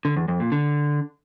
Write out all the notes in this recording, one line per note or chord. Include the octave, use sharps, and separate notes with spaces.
D3
E2
F2
A#2
D3